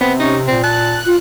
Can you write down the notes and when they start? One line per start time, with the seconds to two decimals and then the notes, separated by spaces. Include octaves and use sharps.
0.01 C3 B3
0.20 C#4 D#4
0.48 A#2 C4
0.64 A5 F#6
1.06 F4